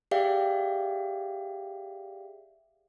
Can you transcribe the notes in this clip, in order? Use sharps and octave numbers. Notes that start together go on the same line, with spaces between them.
G4 G#4 D5 E5 F5 G5